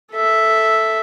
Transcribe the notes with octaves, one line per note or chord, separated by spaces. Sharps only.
A4 E5